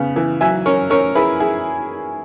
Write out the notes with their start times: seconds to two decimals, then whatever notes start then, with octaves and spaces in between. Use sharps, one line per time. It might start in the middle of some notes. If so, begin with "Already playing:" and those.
Already playing: C#3 B3
0.16 E3
0.41 F#3 E5 G#5
0.66 C#4 A#4 C#5
0.90 C#4 A#4 C#5
1.15 E4 G#4 B4
1.40 E4 G#4